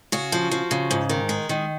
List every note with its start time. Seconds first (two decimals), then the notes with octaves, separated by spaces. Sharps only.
0.12 C#3 F#4
0.32 F3
0.51 F3
0.71 C#3
0.91 G#2
1.09 D#3
1.29 G#3
1.49 D#3